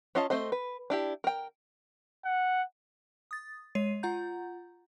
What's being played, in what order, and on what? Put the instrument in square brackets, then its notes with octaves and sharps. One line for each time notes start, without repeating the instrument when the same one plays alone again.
[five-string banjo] C#4 F4 D#5 F5 A5
A3 C4 C5 D#5
B4
D4 E4 G4
A#4 G5
[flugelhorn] F#5
[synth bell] D#6 A6
G#3 C#5 C7 D#7
F4 F#5 A#5 G6